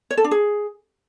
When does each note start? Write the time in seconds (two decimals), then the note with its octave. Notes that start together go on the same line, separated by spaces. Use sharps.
0.11 C#5
0.17 A4
0.24 D4
0.31 G#4